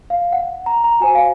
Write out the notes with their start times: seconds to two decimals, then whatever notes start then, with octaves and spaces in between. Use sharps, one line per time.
0.10 F5
0.33 F#5
0.66 A#5
0.84 A#5
1.00 F#4 C5 G#5
1.15 F5